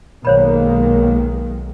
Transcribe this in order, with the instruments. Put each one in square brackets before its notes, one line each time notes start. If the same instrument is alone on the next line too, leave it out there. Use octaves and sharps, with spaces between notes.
[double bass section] B1 D#3 G#3 [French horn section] A#3 [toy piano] C5 C#5 B5